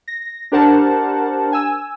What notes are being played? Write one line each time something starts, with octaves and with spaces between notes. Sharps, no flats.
A#6
D4 G4 A#4 C5 F#5 A5
G#5 E6